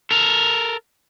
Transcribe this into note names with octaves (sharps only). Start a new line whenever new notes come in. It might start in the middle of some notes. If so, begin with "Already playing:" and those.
A4 A#4